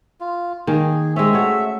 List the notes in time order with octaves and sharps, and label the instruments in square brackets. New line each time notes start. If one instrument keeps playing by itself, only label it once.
[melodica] F4
[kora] D#3 A#3 [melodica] G#4
[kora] G#3 C4 C#4 [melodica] E5
[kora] A3 F#4 C#5